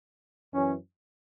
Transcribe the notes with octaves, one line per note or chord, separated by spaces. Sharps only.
F#2 E3 C#4